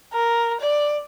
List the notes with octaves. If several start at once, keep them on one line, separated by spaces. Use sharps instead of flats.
A#4
D5